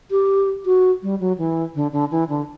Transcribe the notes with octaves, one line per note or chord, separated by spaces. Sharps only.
G4
F#4
G3
F#3
E3
D3
D3
E3
D3